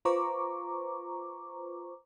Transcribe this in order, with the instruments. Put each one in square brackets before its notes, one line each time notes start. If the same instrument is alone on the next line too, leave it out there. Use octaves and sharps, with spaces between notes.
[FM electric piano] F4 B4 C5 A#5 C#6 D6